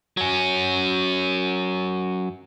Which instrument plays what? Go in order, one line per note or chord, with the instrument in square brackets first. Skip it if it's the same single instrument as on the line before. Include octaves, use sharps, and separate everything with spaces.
[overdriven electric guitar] F#3 C#4